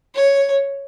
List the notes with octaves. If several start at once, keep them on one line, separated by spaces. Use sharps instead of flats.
C#5